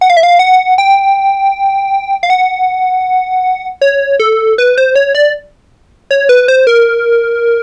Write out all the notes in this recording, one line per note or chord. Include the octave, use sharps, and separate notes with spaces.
F#5
F5
E5
F5
F#5
G5
F5
F#5
C#5
A4
B4
C5
C#5
D5
C#5
B4
C5
A#4